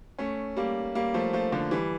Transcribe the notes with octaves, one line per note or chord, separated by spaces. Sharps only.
A3 C#4
G3 A#3
G3 A#3
F3 A3
F3 A3
D3 F3
E3 G3